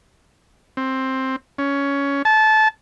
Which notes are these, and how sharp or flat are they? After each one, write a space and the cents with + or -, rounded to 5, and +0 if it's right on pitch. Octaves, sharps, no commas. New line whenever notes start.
C4 +10
C#4 +15
A5 -20